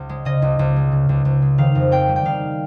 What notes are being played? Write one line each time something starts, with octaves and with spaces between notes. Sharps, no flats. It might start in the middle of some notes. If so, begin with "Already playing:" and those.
Already playing: C#2
G#3
C#3 D#5
C#2
C#2
G#3
C#3
C#2
C#2
G#3
D#3 F5
F2
C4 G5
G3
G5
D#3 F5